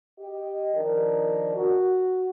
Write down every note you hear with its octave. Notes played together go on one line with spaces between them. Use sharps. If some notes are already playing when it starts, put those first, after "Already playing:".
G4 D#5
D#3 F3 D4 A#4
F#4